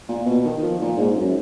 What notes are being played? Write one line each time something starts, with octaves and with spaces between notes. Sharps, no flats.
A#2
B2
D#3
F3
A#2
G#2
F#2